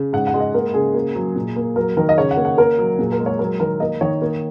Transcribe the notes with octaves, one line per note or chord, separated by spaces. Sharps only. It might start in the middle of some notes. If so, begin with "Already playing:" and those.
Already playing: C#3
G#2 F#5
F#5
G#3
D#5
A#3 A#4
C#3 G#4
A#3
F#3
A#2
A#3
F#3 A#4
D#3 A#4
D#5
C#3 C#5
F#5
A#3
F#5
A#3 A#4
F#3
A#2 G#4
A#4
G#3
C#5
F#3 A#4
D#3 A#4
A#3 D#5
D#3 C#5
A#3